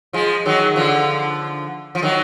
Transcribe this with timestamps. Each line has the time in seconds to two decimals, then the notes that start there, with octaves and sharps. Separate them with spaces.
0.13 F3 G#3
0.46 D#3 F#3
0.76 D3 F3
1.95 F3
2.02 D#3 F#3